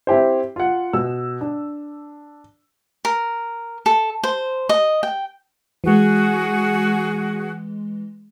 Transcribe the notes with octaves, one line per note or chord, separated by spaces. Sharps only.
C4 E4 G4 C5
F4 F#5
B2 E6
D4
A#4
A4
C5
D#5
G5
E3 G#3 F#4 G#4